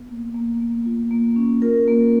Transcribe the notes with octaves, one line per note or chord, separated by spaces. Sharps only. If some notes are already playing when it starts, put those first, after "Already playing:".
Already playing: B3
A#3
A#3
A#3
F4
A#3
C#4
F4 A#4
A#3